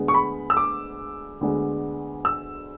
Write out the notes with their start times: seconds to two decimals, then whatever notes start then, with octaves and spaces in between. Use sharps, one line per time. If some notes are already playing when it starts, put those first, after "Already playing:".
Already playing: D2 D3 G#3 B3
0.08 C#6
0.14 B5
0.50 E6
0.57 D6
1.41 D2 D3 G#3 B3
2.25 E6